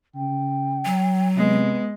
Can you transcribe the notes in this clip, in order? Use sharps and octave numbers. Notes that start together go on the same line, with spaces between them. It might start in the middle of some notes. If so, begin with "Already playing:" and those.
C#3 G5
F#3
C3 G#3 B3